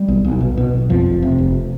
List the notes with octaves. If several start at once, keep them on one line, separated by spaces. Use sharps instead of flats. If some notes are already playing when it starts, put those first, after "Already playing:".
Already playing: G3
B1
B1
B2
B2
B1
F2 F3
F1
C3
F1